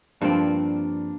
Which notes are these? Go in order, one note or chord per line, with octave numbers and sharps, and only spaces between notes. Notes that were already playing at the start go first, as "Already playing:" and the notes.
G2 F3 A#3 C4 D4